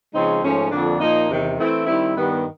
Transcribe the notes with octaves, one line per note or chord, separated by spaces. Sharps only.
C#3 F3 G#3 C4 D#4
G#2 F3 A3 C#4
F2 D3 F3 A#3 D4
A#2 F3 A#3 D#4
E2 C3 D#3
E3 A3 C4 E4
D#3 G3 C4 E4
G2 D#3 G3 B3